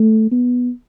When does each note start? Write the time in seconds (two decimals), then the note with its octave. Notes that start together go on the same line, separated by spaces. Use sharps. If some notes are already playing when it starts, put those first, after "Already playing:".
Already playing: A3
0.31 B3